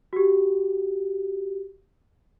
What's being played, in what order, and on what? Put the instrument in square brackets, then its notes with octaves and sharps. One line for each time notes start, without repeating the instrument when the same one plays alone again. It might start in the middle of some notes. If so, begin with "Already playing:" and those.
[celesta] F#4 G4